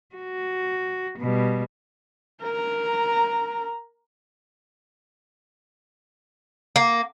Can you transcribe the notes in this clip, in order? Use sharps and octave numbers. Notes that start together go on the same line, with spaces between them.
F#4
B2 G3
A#4 A#5
A#3